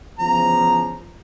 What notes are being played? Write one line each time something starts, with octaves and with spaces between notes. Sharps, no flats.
E2 C#3 F3 A#5